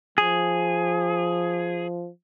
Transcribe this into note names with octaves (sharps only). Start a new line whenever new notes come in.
F3 G#4